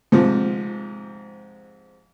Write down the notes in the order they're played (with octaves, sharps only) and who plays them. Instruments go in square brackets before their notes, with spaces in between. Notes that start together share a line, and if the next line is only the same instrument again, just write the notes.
[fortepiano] G#2 C3 F3